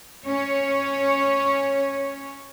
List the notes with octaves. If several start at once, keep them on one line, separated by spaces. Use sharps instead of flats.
C#4 C#5